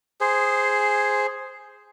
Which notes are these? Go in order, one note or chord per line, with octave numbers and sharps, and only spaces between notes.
G#4 C5